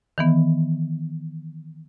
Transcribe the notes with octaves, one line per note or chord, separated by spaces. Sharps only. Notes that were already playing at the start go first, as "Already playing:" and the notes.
D#3 E3 B3